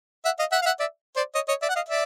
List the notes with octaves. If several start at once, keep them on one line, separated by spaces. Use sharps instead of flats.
E5 F#5
D#5 F5
E5 F#5
F5
E5 F#5
D5 E5
C5 D5
C#5 D#5
C#5 D#5
D5 E5
F#5
D#5 F5
D5 E5